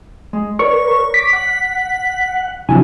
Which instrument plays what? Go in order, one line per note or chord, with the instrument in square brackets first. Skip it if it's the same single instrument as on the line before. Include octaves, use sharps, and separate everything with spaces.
[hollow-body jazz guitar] G#3
[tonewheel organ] A#4 B4 [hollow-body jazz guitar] C#5 D5 [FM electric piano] C#6
[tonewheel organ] D6 [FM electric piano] B6
[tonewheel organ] F#5
[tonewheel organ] C3 F#3 E4 [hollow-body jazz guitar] F3 D4 G#5